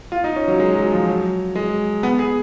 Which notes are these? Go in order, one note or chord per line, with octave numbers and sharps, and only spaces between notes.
F4
D#4
C#4
F#3
G#3
F#3
F3
F#3
G#3
B3
G#4